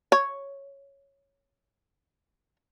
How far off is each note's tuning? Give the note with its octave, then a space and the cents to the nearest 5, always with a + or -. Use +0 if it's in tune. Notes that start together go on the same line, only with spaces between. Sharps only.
C#5 +0